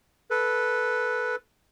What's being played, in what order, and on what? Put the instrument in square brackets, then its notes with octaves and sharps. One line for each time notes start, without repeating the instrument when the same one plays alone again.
[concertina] A4 B4